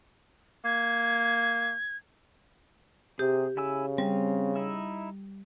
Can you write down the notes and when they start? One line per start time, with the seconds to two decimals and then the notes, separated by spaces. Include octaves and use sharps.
0.65 A#3 G#6
3.19 C3 G4 G#4
3.57 C#3 E4 G#5 E6
3.98 G3 C4 C#4
4.56 D#4 E4 E5